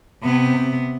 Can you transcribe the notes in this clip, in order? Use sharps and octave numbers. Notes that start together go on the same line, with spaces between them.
C3 B3